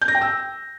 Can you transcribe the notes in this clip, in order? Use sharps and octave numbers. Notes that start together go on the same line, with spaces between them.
G6
A#6
G5
E6